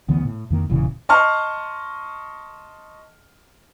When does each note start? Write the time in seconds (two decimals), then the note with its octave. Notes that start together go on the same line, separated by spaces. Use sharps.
0.09 D2 E3 B3
0.25 A2
0.50 F2 D#3 A#3
0.70 E1 A#2 C#3 E3
1.09 D#5 A5 C6 C#6 F6